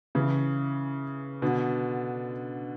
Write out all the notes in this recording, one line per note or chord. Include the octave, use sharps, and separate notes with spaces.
C#3 E3
B2 D3